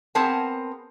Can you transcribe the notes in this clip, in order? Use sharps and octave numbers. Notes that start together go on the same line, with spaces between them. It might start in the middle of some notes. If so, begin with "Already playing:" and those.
B3 C4 G#4 A#4 A5